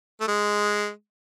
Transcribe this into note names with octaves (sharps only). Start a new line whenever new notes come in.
A3
G#3